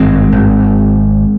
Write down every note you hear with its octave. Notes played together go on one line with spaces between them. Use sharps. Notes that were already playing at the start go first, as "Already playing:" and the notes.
Already playing: G#1 G2 G#3 C4
G#1